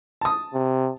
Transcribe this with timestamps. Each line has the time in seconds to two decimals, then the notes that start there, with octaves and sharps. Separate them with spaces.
0.21 A5 D#6
0.54 C3